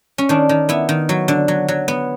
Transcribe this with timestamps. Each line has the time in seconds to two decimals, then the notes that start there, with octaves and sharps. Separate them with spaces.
0.18 C#4
0.29 D#3 D4
0.49 D#3
0.69 B3 E4
0.89 D#3
1.09 F#3
1.28 D3
1.48 F#3
1.68 F#3
1.88 B3